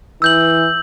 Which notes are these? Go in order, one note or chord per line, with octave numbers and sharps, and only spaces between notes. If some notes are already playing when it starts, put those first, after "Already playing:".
E3 E6 G6 F#7